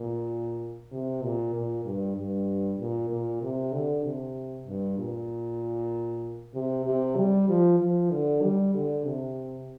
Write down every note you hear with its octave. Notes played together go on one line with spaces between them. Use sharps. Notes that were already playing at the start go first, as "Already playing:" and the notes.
Already playing: A#2
C3
A#2
A#2
G2
G2
A#2
A#2
C3
D3
C3
G2
A#2
C3
C3
G3
F3
F3
D3
G3
D3
C3